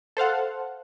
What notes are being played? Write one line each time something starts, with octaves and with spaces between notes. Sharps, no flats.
A4 C5 F5 F#5